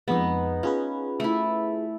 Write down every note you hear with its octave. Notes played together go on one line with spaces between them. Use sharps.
F2 G#3 B3 D#4
C#4 F4 G#4 B4
A3 E4